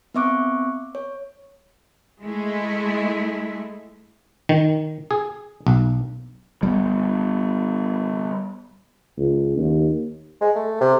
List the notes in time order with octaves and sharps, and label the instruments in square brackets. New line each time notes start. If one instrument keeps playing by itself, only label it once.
[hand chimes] B3 C4 E5 C#6 D6 F#6
C#5
[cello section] G#3 A3 E4
[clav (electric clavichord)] D#3
G#4
B1
[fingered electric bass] G3 A#3 B3
[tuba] C#2
D#2
[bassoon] G#3
A3
C3